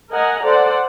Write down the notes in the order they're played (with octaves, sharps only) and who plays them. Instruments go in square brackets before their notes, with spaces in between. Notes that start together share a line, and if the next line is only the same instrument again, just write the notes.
[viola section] A#4 D#5 F#5 G#5 A#5
A4 C5 D5 F#5